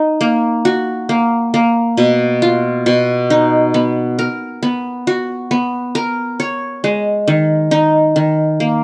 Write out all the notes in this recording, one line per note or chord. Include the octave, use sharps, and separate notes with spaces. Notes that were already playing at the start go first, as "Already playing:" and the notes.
Already playing: D#4
A#3
F#4
A#3
A#3
B2
F4
B2
D#4
B3
A#4
B3
F#4
B3
A#4
C#5
G#3
D#3
D#4
D#3
A#3